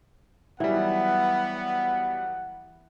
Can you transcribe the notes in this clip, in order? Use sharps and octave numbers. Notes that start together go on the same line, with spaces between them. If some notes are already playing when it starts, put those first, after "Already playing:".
E3 F#3 G3 B3 F#5